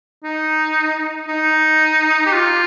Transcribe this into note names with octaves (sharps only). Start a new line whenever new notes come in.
D#4
D#4
G4
F4